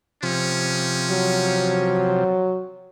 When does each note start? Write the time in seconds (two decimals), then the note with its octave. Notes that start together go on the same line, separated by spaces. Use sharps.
0.23 C3 F3 C#4
1.10 F#3